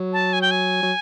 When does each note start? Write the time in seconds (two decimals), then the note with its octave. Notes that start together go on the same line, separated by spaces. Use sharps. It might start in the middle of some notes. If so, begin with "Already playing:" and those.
Already playing: F#3
0.13 A5
0.33 G#5
0.42 G5
0.51 G#5
0.83 F#3